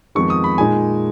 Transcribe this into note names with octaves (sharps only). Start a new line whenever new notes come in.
F2 D#3 G#3 B3 D#4 C#6
D#6
B5
A#2 G#3 D#4 G#5